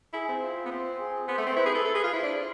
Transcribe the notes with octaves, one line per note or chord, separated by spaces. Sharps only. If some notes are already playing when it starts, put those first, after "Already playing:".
E4 G#4
C4
F4
B3
C4
G#4
B3 C5
A3
C4
E4 B4
G#4
A4
A4
G#4
F4
E4 C5
D4